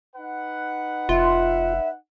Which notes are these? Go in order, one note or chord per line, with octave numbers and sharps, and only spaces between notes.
D#4 B4 F#5
F1 F4 E5